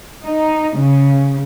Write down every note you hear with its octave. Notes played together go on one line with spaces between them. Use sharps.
D#4
C#3